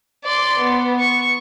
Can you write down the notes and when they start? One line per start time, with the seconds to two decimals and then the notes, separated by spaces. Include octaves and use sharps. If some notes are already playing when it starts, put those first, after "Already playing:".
0.24 D5 C6
0.59 B3
0.99 C#6